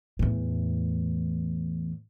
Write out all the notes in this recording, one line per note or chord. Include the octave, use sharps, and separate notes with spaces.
E2 A2